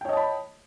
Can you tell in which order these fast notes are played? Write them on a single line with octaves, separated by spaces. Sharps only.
G5 C#5 D#5 A5 B5